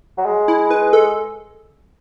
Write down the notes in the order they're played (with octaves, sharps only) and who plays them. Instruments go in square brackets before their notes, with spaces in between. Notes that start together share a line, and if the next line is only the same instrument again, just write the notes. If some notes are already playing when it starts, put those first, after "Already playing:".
[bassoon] F#3
G#3
[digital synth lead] E4
B4
A4